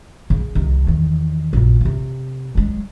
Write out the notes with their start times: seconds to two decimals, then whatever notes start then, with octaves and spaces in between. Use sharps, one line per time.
0.30 C#3 A#3
0.55 C2 D#3
0.87 E2 D#3
1.53 A#1 F#2
1.81 C3 C4
2.55 F#3 G#3